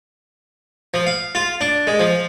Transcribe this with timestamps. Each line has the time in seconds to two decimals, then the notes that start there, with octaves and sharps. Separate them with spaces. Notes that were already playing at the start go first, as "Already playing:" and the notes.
0.94 F3
1.07 F5
1.35 F4
1.61 D4
1.87 G#3
1.99 F3